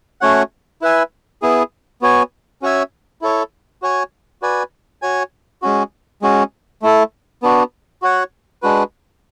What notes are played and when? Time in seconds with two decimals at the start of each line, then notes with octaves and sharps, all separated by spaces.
0.21 A3 C#4 F#4 C#5 F#5
0.82 E4 B4 E5 G#5
1.42 B3 E4 G#4
2.02 B3 F#4 C#5 G#5
2.62 C#4 F#4 C#5 E5 G#5
3.22 E4 A4 C#5
3.82 F#4 C#5 G#5
4.42 F#4 B4 D5 G#5
5.02 F#4 C#5 G#5
5.62 G#3 C#4 F#4
6.22 G#3 C#4 F#4
6.82 A3 E4 A4
7.43 B3 D4 F#4
8.02 F#4 C#5 F#5
8.62 G#3 D4 F#4 B4